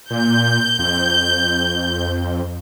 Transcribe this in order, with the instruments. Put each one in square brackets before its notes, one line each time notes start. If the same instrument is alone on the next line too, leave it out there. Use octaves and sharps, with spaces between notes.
[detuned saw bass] A#2 [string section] G6
[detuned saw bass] F2